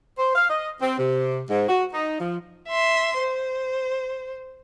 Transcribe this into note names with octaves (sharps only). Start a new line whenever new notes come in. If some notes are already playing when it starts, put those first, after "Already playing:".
C5
F5
D#5
C4
C3
G#2
F#4
D#4
F3
E5 C6
C5